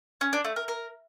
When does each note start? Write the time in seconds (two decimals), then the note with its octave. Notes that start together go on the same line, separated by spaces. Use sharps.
0.21 C#4
0.33 D4
0.45 A3
0.56 A#4
0.68 A#4